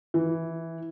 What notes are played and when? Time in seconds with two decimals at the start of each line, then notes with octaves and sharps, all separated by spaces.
0.14 E3